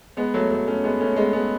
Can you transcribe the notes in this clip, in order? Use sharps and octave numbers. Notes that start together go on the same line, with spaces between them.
G#3 B3
F#3 A3
F#3 A3
A3 C#4
G#3 B3
A3 C#4
G#3 B3
G#3 B3